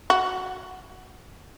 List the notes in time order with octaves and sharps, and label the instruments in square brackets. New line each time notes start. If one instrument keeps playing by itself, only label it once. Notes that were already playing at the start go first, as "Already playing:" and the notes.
[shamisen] F#4